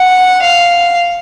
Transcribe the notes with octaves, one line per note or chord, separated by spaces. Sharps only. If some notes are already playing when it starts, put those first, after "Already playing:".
Already playing: F#5
F5